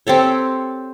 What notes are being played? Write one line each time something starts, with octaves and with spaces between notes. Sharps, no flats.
C4 G4 A4 C#5